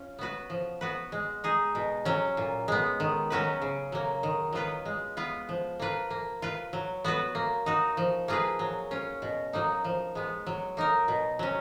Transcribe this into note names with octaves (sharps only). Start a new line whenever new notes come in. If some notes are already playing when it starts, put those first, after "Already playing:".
Already playing: C#4 F4
B3 F#4 B4
F3
B3 F#4 B4
G#3
D#4 G#4
B2
F#3 C#4
A#2
G#3 B3
D#3
F#3 C#4 F#4 B4
C#3
F#3 A#3
D#3
F#3 B3 F4 B4
G#3
B3 F4 B4
F3
A#3 F4 B4
A#3
F4 B4
F#3
B3 F#4 B4
A#3
D#4 F#4
F3
A#3 F4 G#4 B4
F#3
C#4 F4
B2
F#3 A#3 D#4
F3
G#3 B3
F#3
A#3 D#4 A#4
B2
F#3 C#4